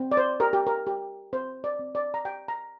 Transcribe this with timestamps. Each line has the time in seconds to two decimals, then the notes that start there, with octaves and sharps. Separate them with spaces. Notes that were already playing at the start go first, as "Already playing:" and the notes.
Already playing: C4
0.12 D5
0.17 C5
0.40 G4 A#4
0.53 G4
0.67 A#4
0.87 G4
1.33 C4 C5
1.64 D5
1.79 C4
1.95 D5
2.14 A#5
2.25 G4 G5
2.48 A#5